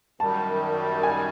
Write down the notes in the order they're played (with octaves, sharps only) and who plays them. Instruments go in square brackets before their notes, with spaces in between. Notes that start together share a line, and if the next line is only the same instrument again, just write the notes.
[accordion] F#2 D#3 G3 [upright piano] A5
[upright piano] G#5